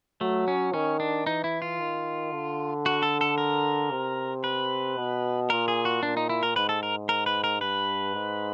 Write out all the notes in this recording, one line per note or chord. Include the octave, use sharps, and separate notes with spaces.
F#3 A3
C#4
D#3 C#4
D4
E3 D#4
E4
F4
D#3
D3
F#4
A4
A4
A#4
C3
B4
B2
A#2 A#4
G#4
F#4
A#2 D4
D#4
E4
A#4
G#2 B4
A4
A#4
A#4
B4
A#4
G2 B4
G#2